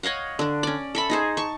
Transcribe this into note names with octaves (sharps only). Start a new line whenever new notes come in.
C#5 D#5 F5 F#5
D3 D4
C#4 D5
A4 E5 B5
D#4 G#4 C5
A5 C#6